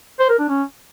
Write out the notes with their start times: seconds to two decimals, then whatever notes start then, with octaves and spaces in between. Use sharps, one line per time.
0.19 C5
0.29 A#4
0.39 D4
0.49 C#4